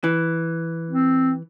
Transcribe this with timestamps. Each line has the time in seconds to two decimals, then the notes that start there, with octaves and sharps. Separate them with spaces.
0.04 E3
0.91 C4